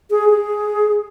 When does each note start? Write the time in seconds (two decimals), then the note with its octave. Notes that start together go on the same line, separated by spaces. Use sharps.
0.11 G#4
0.29 G#4